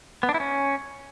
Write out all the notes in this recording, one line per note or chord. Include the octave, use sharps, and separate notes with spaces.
B3
D4
E4
C#4